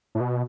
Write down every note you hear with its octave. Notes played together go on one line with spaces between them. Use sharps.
A2
B2